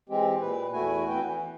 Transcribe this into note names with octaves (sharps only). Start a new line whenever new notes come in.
E3 G#3 C4 G4
A#2 B4
E2 A3 E4 F#4 G#5
F2 B3 E4 F#4 B4 G5
E3